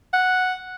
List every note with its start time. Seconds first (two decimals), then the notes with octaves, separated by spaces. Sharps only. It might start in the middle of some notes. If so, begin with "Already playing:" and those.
0.13 F#5